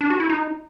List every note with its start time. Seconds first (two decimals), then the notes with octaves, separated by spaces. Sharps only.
0.01 D4
0.10 F#4
0.20 E4
0.29 D#4